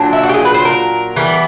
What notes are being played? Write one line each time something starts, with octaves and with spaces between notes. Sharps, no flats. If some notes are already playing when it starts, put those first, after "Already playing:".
Already playing: A#2 F#3 A#3 D4
E4
F#4
G4
G#4
B4
C5
A#4
E3 G3 B3